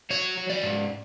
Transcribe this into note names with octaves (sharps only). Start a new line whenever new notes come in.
F#3 C#5
F#3
D5
G#2